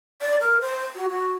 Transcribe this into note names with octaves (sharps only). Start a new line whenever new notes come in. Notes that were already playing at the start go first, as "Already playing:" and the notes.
D5
A#4
C5
F#4
F#4